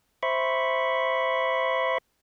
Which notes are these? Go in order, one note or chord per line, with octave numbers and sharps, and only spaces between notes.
C5 E5 B5 C#6